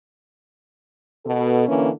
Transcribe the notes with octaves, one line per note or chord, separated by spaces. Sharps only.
B2 A4
D3 E3 A#3 C#4